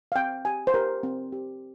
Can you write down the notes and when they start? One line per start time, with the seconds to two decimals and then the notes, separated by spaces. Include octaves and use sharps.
0.12 F5
0.16 C4 G5
0.45 G4 G#5
0.67 C5
0.74 G4 A#4
1.03 C4
1.32 G4